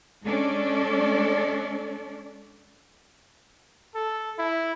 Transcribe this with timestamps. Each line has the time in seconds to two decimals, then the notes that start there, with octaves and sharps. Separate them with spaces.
0.24 G#3 C#4 D4 A4 D5
3.95 A4
4.39 E4